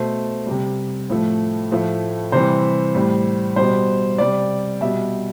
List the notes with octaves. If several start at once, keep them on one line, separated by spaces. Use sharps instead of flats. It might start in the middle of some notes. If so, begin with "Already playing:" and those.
Already playing: B2 A3 C5
C3 G3
A2 F3 A3
A2 F3 A3
C3 E3 G3 C5
A2 G3
B2 G3 C5
C3 G3 D5
B2 G3 E5